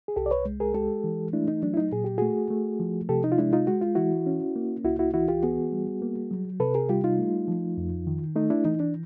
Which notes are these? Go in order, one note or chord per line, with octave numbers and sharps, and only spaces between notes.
G#4
C2 G4 A4
D5
B4 C#5
G#3
G#4 A#4
G#3 G4 A4
E3
A3 D4 E4
D#4
F#3 D4
E4
D#4
A#2 G#4
G4
A3 F#4 G#4
A3
F3
C3 G4 A4
D#4
F4
G#3 D4 E4
D#4 F4
G#3 F#4
F4
E3 E4 F#4
C#4
A#3
C#2 E4 F#4
E4 F#4
E3 E4 F#4
F4 G4
B3 F#4 G#4
G3
A#3
F#3
C3 A4 B4
G#4 A#4
G3 F4 G4
D#4 F4
A3
F3
F2
D#3
A3 D#4
D4 E4
E3 D#4
D4